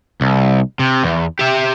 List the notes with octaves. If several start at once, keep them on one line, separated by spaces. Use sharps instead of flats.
C2
C3
E2
G4 E5